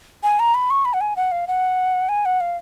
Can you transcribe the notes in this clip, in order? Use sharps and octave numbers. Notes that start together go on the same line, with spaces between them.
G#5
A#5
B5
C#6
B5
F#5
G#5
F#5
F5
F#5
G#5
F#5
F5